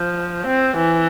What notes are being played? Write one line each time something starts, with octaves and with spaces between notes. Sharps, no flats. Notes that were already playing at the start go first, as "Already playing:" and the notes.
Already playing: F3
C4
E3